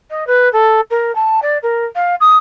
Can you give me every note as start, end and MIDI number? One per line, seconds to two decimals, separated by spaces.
0.10 0.27 75
0.27 0.51 71
0.53 0.81 69
0.90 1.14 70
1.15 1.40 81
1.42 1.58 74
1.63 1.85 70
1.95 2.15 77
2.20 2.38 87